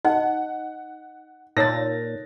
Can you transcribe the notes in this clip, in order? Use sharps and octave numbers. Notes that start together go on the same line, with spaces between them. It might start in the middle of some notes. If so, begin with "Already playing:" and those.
D#4 D#5 F#5
A#2 D#4 A#4 C#5 A6 A#6